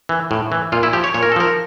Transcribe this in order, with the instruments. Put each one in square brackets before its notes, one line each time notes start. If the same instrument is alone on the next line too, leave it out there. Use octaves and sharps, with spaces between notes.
[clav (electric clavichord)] E3
A2
E3
A#2 F4
E4
F3 G4
C#5
A#2 C#5
A#4
A4
F3 A#4